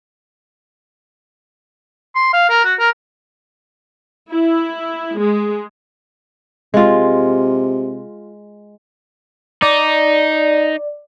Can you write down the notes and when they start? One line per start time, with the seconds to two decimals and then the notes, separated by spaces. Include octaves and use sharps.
2.15 C6
2.33 F5
2.50 A#4
2.65 F#4
2.79 A#4
4.33 E4
5.18 G#3
6.74 C3 G#3 F4
9.62 D#4 D5